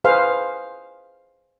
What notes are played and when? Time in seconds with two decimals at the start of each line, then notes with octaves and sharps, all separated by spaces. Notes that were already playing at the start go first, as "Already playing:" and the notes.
0.04 G#4 B4 C5 F5